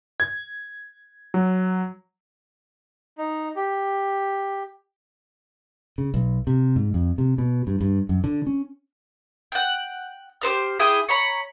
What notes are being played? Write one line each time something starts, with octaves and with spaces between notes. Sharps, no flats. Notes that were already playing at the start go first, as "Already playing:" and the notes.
G#6
F#3
D#4
G4
C#3
B1
C3
G#2
F2
C3
B2
G2
G2
F#2
D3
C#4
F#5 G5
G4 B4 C5 F6
E4 G#4 G5 D6
C#5 A#5 B5